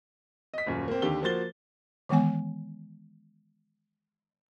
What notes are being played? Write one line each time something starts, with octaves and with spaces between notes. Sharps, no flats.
D#5 B6
D#1 F#2
A#3 C4
D#2 D3 G4 G7
F3 A#3 F#4 C5 A6 G7
D#3 E3 G#3 B3 G#5